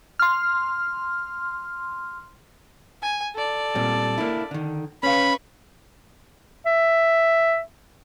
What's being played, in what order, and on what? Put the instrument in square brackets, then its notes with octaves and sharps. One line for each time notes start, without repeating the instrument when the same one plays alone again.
[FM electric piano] C6 F6
[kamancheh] G#5
A4 D5
[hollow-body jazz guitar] A#2 G3 C4
A#3 D4 E4
D3 D#3
[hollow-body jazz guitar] C#4 F5 [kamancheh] B4 C#6 [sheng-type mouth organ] B5
[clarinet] E5